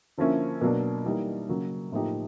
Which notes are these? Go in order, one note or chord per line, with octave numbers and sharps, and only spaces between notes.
D3 F3 A#3 C#4 E4
B2 F#3 A#3 D4
E3 G3 A#3 D#4
C#3 F#3 A#3
A2 F3 A#3 D#4 G4